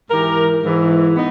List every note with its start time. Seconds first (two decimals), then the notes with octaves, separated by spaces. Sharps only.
0.09 G#2 E3 G4 A#4
0.63 G#2 E3
1.15 B3 D#4